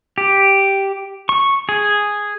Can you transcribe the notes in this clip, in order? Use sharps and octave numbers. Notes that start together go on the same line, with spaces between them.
G4
C#6
G#4